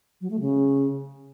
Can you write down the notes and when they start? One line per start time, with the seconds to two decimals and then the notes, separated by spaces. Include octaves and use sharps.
0.21 F#3
0.31 A3
0.40 C#3